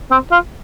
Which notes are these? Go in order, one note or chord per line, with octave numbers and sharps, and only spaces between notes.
C4
F4